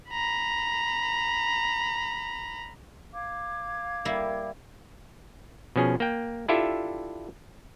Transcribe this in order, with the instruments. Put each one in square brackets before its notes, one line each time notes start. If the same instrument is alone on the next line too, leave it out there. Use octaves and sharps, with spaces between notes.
[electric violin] A#5 B5
[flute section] F5 D6 G#6
[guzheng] G3 A#3 E4
[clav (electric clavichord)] B2 F3 C#4 G#4
A#3 G5
D4 E4 F4 G4 A4 E5